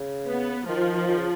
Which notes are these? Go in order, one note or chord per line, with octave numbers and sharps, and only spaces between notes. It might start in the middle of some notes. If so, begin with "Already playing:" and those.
Already playing: C#3
B3
D#3 F3
D#3
C#3